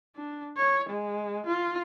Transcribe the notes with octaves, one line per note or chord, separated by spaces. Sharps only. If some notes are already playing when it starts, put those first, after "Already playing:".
D4
C#5
G#3
F4